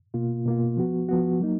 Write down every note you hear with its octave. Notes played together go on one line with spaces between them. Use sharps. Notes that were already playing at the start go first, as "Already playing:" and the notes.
B2 A#3 F4
B2 A#3 F4
F3 B3 F#4
F3 B3 F#4
F#3 A#3 D#4